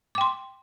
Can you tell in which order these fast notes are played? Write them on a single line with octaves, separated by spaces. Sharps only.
D6 G5 C6